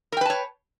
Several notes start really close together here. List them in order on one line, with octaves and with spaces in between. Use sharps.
A#4 G5 B4 A5 C#5